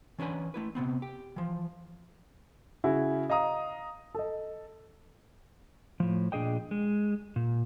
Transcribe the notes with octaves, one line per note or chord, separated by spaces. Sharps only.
E3 C#4 D4 B4 G#5
A3 E4 B4
C3 F3 B3 C4
G4
E3 F3
C#3 E4 F#4 G#4
D#5 F5 A#5 D#6
A4 D#5
A2 F3
A#2 D4 G#4 D#5 G5
G#3
A#2